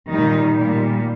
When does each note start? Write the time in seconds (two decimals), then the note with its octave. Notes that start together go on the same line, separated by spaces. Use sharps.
0.10 A#2 D#3 G3 D#4
0.56 A#2 G3